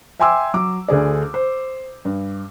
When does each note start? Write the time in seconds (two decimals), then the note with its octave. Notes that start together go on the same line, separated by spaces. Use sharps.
0.20 E5 G5 G#5 C6 D6 E6
0.54 F#3 D6
0.88 D2 D3 G#4 D5
1.34 C5
2.05 G2